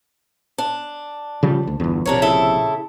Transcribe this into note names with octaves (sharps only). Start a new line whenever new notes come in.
D4
C#3 F3 G3
D2
G1 E2
A#1 C3 D4 A#4 C#5
C#3 E4 A4